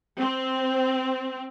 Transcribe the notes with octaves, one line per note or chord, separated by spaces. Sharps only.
C4